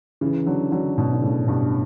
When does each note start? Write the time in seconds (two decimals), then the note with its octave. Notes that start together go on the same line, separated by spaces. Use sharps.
0.21 C#3 E3
0.46 D3 F#3
0.72 D3 F#3
0.98 B2 D3
1.13 D3
1.22 A2 C#3
1.47 G2 B2